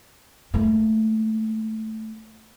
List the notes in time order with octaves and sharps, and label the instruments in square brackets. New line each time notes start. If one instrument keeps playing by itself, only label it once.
[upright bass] A3 A#3